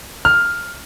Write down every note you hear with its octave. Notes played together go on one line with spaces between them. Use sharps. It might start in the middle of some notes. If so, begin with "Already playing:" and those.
F6